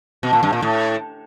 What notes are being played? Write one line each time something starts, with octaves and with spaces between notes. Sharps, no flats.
B2
A#2
G2
A#2
A2